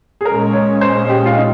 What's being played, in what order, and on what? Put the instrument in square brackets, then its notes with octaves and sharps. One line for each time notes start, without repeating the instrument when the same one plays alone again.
[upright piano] G#4
[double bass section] A#2 G#3 C#4 [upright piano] A#4
[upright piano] C#5
C5
G4
F4
D#4